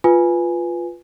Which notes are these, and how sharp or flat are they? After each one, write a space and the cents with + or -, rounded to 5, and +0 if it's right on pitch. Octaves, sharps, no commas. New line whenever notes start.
F4 +0 B4 +0 G#5 +0